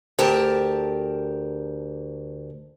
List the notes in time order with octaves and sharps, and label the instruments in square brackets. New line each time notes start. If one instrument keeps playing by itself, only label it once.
[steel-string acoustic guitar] D2 G4 A#4 A5